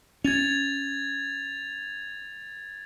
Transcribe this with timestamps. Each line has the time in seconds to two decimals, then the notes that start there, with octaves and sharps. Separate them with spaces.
0.24 C#4 G#6 A6 F7